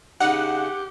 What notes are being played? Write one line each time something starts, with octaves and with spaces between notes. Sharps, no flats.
C#3 D#4 G4 F#5